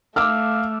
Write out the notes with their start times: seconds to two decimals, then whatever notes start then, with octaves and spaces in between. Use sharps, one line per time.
0.16 A3 F5 D6 E6 F6